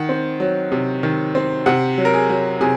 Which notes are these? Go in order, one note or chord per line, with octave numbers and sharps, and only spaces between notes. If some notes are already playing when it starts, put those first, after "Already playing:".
Already playing: D#3 F#5
C4
F#3
C3
D#3
C4
C3 F#5
F#3
A#4
G#4
F#3
C3 G#4